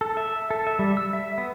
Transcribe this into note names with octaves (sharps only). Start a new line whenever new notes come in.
A4
E5
A4
E5
G3
E6
E5
B3